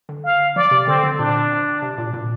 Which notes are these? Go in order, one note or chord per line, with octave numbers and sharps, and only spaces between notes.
D3
F5
F3 D5
C3
D3 C4
D3
A#2 D4
C3
A#2
A#2